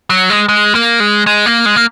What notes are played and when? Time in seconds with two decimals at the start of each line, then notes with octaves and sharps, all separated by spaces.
0.10 F#3
0.30 G#3
0.49 G#3
0.75 A#3
1.00 G#3
1.26 G#3
1.46 A#3
1.66 G#3
1.76 A#3